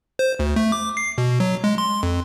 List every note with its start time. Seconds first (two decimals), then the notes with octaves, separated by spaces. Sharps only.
0.19 C5
0.39 D2
0.56 A3
0.72 D6
0.97 C7
1.18 B2
1.40 F#3
1.64 G#3
1.78 C6
2.03 F2